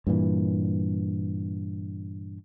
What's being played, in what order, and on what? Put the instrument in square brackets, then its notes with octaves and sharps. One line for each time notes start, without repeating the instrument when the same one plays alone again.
[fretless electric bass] G2 A#2 E3